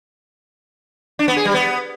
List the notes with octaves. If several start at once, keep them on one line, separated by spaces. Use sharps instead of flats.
D4
B3
G#4
G3
B3